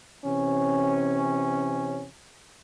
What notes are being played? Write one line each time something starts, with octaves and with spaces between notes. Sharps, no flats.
C3 E3 C#4